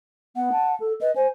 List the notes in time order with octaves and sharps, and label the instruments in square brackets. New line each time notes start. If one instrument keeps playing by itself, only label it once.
[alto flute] B3 [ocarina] F#5
[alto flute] A5
A4
[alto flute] B4 [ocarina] D#5
[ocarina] C5 [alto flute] G#5